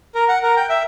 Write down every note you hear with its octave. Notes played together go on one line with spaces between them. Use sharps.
A#4
F#5
A#4
G5
E5